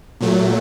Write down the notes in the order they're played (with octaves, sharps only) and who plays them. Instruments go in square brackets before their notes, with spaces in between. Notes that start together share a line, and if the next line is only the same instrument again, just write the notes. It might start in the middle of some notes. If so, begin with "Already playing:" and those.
[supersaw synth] A#2 F#3 A3